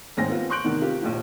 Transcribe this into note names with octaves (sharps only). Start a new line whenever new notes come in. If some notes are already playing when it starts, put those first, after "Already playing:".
G#1 D#2 G#2 C5 G#5 A#6
B3 C4 F4
C6 C#6 F#6 G6 D7 F#7
E2 C3 D#3
C4 F4 G4
A#1 D#2 F3